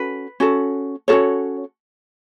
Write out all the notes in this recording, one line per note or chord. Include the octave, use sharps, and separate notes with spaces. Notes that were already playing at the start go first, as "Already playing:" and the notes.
Already playing: C#4 F#4 A4 B4
C#4 F#4 A4
C#4 F#4 A4 C#5